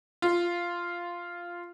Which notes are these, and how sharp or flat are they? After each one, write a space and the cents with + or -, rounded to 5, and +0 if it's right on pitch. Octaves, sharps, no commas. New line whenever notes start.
F4 -5